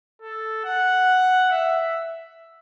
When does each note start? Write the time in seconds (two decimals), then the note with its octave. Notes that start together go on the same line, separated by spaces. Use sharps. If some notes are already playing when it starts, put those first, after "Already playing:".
0.22 A4
0.65 F#5
1.51 E5